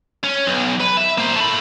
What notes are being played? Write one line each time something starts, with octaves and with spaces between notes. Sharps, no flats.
C#4
B1
B4
E5
A#3 C5
A3 B5